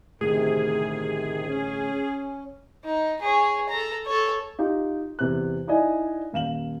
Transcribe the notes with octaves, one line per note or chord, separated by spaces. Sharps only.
A1 D2 A2 C3 D#3 G#4
C#4
D#4
G#4 C#5
A4 A#5
A4 C#5
D#4 F4 G4
E2 C3 F#6
D#4 E4 D5 D#5 G#5
D#1 F5 E7 F#7